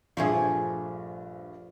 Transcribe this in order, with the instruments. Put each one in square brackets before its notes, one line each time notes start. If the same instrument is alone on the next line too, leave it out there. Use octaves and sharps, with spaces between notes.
[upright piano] A#1 G2 [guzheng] F3 A3 G#4